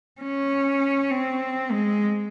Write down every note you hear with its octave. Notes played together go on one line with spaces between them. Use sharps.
C#4
C4
G#3